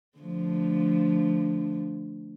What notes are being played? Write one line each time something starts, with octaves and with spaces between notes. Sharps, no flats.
D3 F3 A3